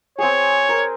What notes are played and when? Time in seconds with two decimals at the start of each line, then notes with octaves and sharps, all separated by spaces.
0.18 C4 G#4 C#5
0.69 A#4